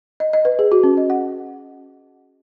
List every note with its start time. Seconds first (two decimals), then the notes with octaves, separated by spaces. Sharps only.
0.20 D#5
0.33 D#5
0.45 B4
0.59 G#4
0.72 F#4
0.84 C#4
0.97 D#5
1.10 F#5